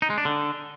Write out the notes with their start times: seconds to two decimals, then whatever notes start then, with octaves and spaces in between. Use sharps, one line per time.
0.02 D#4
0.10 G#3
0.18 D4
0.25 D3